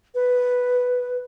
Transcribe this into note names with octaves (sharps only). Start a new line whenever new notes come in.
B4